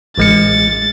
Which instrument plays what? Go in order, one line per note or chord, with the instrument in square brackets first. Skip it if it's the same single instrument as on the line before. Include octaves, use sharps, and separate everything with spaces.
[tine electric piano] A1 G#3 C#7 [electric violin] A6